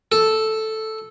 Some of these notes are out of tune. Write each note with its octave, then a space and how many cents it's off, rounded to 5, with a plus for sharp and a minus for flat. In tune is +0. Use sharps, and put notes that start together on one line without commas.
A4 -5